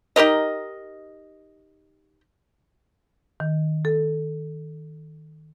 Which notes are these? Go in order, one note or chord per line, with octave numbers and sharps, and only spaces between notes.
D#4 G4 A#4 D#5
D#3
A4